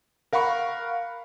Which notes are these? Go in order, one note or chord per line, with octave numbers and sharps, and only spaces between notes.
A#4 F5 F#5 B5 C#6